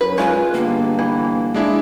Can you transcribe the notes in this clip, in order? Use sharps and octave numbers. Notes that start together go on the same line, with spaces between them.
F#2 B4
G#3 F4 B4
G1 A#3
E3
G#3 D4 E4